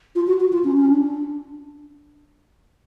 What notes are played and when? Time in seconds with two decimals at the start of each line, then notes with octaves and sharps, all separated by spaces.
0.15 F4
0.27 F#4
0.40 F#4
0.53 F4
0.64 C#4
0.77 C#4
0.89 D4